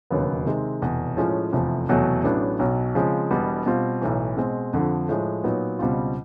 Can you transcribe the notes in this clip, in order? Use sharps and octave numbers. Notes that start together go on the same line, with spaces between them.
E1 D#2 C#3 F#3 B3
C3 D#3 G#3 C4
F1 E2 B2
A2 F3 G#3 C#4 F4
F1 E2 C3 F3 A3
F1 E2 B2 F#3 A3
A1 A2 F#3 B3 D4
B1 B2 F#3
C#3 F3 G#3 C4
E1 E2 B2 G3 B3
B2 G3 C4 F4
B1 A2 E3
B2 G#3 C4
F2 D3 F3
A2 F3 G#3
A#2 F#3 B3 D#4
C#2 B2 G3 C4 F4